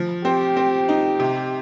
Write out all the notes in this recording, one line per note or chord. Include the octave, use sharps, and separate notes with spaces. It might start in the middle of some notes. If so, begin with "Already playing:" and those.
Already playing: F3
C4 G4
C4
D#4
C3